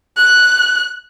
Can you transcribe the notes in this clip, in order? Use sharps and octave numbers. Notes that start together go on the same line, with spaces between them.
F#6